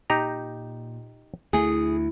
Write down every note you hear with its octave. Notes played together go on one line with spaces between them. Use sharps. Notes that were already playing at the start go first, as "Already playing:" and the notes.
A#2 D#4 G4 A#5
D2 A3 E4 G#4